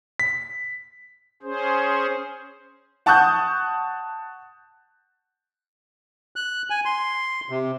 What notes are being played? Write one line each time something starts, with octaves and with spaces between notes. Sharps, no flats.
B6
C#4 G#4 C5
F#5 A5 C#6 D#6 F#6 G6
F#6
G#5
C6
C3